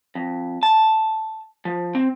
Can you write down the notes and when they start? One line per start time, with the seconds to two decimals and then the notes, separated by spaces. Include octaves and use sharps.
0.15 F2
0.63 A5
1.65 F3
1.95 C4